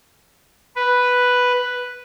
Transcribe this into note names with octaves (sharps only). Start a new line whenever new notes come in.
B4